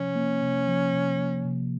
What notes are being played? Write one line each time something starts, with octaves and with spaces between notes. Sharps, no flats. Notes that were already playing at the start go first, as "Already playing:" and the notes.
Already playing: C3 F3 C#4
A#3
C3
F3
C3
A#3
C3